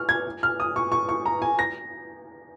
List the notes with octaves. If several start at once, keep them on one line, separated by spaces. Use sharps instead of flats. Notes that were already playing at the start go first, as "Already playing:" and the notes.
Already playing: C#6 F6
G#6
F6
D#6
C#6
C#6
C#6
A#5
G#5
A#6